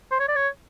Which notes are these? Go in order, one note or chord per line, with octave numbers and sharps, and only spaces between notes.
C5
C#5
D5
C#5